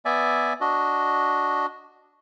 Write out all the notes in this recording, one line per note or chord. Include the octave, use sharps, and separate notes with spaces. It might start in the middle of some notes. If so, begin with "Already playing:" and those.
B3 D5 E5 G#5
D4 F#4 D#5